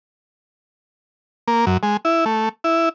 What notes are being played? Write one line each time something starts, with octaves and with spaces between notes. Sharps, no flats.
A#3
F#2
G#3
E4
A3
E4